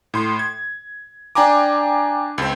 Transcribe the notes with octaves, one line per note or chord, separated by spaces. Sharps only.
A2 C6
G#6
D4 G5 G#5 A#5 D6
C#2 C4